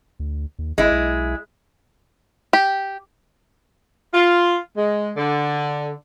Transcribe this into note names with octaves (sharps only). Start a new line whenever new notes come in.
D2
D#2
G#1 G#3 E4
B1
G4
F4
G#3
D3